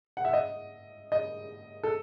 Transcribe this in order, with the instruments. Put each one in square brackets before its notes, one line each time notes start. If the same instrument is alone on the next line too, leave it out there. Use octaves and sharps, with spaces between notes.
[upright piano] F#5
E5
D#5
D#5
A4